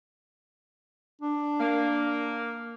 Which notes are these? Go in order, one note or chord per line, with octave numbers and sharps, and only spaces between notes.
D4
A#3